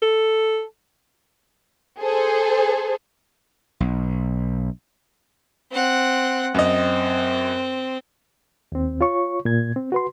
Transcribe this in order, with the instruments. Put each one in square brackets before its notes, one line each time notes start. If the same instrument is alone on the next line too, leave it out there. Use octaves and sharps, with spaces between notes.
[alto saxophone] A4
[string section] G#4 A4 C5
[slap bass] B1
[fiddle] C4 F#5
[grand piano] F#2 D#5 [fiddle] C4
[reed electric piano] D#2 C4
F4 C#5 C#6
A#2 G#6
C4
F#4 B4 C6